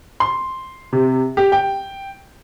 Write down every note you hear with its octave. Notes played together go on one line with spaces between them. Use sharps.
C6
C3
G4
G5